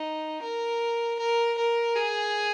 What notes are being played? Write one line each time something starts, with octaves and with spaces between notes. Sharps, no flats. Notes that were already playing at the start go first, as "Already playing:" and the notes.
Already playing: D#4
A#4
A#4
A#4
G#4